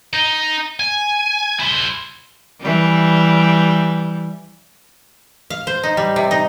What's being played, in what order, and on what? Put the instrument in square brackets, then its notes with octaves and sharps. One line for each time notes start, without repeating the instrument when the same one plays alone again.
[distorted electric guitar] D#4
G#5
E4 C5
[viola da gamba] E3 G3
[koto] F5
C5
D#4
G3
C3
D#4